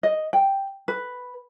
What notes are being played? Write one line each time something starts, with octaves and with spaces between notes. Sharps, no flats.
D#5
G5
B4